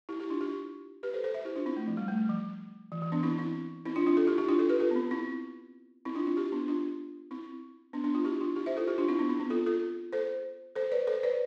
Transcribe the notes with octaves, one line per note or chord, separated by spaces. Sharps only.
E4 G4
E4 G4
D4 F4
E4 G4
G4 B4
A4 C5
A4 C5
C5 E5
E4 G4
D4 F4
C4 E4
A3
F3
G3
A3
G3
F3
E3
E3
B3 D4
C4 E4
C4 E4
C4 E4
D4 F4
D4 F4
F4 A4
E4 G4
E4 G4
D4 F4
F4 A4
G4 B4
F4 A4
B3
C4
C4 E4
C4 E4
D4 F4
D4 F4
E4 G4
B3 D4
D4 F4
C4 E4
B3 D4
B3 D4
D4 F4
E4 G4
D4 F4
E4 G4
C5 E5
F4 A4
E4 G4
D4 F4
C4 E4
B3 D4
C4
B3
F4 A4
F4 A4
A4 C5
A4 C5
B4 D5
A4 C5
B4 D5